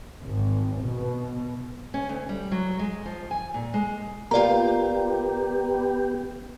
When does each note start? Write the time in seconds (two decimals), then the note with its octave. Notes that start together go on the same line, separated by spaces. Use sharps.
0.24 G#1
0.83 B2
1.94 C#4
2.09 D2
2.29 G3
2.51 F#3
2.79 G#3
3.06 F3
3.31 G#5
3.54 A#2
3.74 G#3
4.31 A#3 B3 F4 G4 D5 A#5